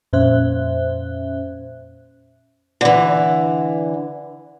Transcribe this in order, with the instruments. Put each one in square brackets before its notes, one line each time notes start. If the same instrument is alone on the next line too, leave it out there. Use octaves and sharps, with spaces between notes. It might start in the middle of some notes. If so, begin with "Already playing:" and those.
[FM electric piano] F2 A#2 C#4 C5 E5 F#6
[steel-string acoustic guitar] D3 E3